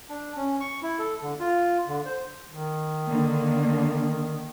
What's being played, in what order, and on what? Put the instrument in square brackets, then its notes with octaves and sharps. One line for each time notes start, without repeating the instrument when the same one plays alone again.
[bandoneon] D4
C#4
C#6
E4
A4
D3
F4
D3
C5
[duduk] D#3
[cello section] D3 A#3